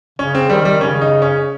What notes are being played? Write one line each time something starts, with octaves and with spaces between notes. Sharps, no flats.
C#3 C#4
C4
D#3 G3
G3
C#3 C#4
D#4
C#4